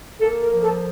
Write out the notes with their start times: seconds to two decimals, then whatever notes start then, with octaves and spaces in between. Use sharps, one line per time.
0.20 A#3 A4
0.42 A#4
0.51 F3
0.63 A4